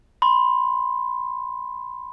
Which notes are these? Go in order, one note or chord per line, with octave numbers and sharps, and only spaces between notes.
B5 C6